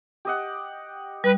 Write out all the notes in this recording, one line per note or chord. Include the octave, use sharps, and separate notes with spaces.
G4 D#5 F#5
G3 B4